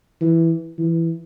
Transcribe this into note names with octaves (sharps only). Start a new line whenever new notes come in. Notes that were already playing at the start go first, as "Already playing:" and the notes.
E3
E3